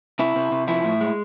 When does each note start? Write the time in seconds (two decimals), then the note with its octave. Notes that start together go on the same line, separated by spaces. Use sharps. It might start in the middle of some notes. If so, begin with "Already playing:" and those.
0.19 C3 E4
0.36 C3
0.52 C3
0.68 F3 E4
0.84 A2
1.01 G#3